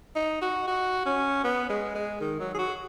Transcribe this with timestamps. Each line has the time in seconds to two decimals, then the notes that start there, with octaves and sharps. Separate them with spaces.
0.16 D#4
0.42 F#4
0.67 F#4
1.06 C#4
1.44 B3
1.69 G#3
1.95 G#3
2.21 D#3
2.40 F#3
2.55 G#4
2.58 F#4